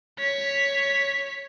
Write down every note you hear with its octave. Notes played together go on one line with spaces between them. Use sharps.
C#5 B6